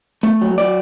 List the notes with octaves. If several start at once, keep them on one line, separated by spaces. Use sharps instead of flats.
A3
F#3
F#3 D5